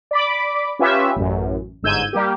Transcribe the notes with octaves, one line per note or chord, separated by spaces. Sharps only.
D5 B5 D6
C#4 F4 G4 B4 E5
A1 F#2
G1 G#2 E6 G6 G#6 D#7
G3 A#3 G4